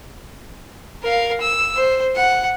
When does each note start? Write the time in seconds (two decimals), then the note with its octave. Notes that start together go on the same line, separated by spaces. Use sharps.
1.03 A#4 F5
1.41 E6
1.76 C5
2.16 F#5